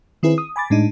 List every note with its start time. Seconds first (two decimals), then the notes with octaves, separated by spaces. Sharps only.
0.23 D#3 C4 E4 G#4 B4
0.38 D#6
0.56 G#5 B5 D6 A6
0.70 A2 G#3 D4 D#4